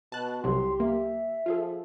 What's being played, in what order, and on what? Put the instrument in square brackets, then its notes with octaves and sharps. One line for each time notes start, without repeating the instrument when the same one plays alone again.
[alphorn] B2 [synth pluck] A5 F#6
[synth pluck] C2 C3 F#3 [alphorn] G4 [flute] C6
[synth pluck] A#3 [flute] E5
[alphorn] F3 [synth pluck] F4 G#4 A4